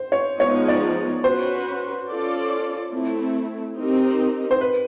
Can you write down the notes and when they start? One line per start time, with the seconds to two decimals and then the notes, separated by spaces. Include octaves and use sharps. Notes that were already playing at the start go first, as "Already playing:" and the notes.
Already playing: C5
0.12 C#5
0.40 F3 G#3 B3 D#4 C#5
0.68 D5
1.24 C#4 F#4 B4 C5
2.08 C#4 F4 A4 D5
2.92 A3 C4 E4
3.77 C4 D#4 G4 A#4
4.51 C5
4.61 B4